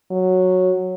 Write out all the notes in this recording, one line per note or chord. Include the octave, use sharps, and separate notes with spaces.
F#3